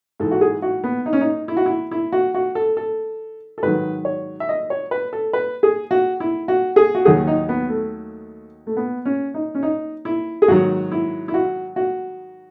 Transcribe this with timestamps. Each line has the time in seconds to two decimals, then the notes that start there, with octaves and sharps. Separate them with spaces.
0.20 G#2 E3 A4
0.31 F#4
0.41 G#4
0.62 F#4
0.84 B3
1.06 D#4
1.13 C#4
1.21 D#4
1.48 E4
1.57 F#4
1.66 E4
1.91 E4
2.13 F#4
2.34 F#4
2.55 A4
2.77 A4
3.58 A4
3.62 G#2 D#3 F#3 B4
4.05 C#5
4.40 E5
4.49 D#5
4.70 C#5
4.91 B4
5.13 A4
5.33 B4
5.63 G#4
5.91 F#4
6.20 E4
6.48 F#4
6.76 G#4
6.95 F#4
7.05 D#2 D#3 F#3 G#4
7.27 D#4
7.49 B3
7.69 A3
8.67 A3
8.77 B3
9.05 C#4
9.34 D#4
9.55 C#4
9.63 D#4
10.05 E4
10.42 G#4
10.48 G#2 D#3 F#3 F#4
10.92 E4
11.28 E4
11.34 F#4
11.76 F#4